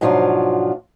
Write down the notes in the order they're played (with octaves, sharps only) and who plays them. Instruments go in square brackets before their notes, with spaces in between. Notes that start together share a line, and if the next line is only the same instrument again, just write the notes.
[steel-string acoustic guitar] G#2 B2 F3 F#3 D4 F4